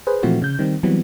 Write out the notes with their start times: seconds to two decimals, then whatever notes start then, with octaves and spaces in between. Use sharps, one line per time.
0.07 G#4 B4 C5
0.23 A#2 E3 F3 A3 C4 F#4
0.42 C#3 G6
0.59 D#3 G3 C4
0.83 E3 F#3 G3 B3 C4